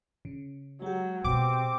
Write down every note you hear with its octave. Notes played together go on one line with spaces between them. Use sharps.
C#3
F#3 G#3 G4
B2 C4 D6